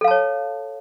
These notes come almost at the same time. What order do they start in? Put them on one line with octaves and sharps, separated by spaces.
A4 F5 A5 C#5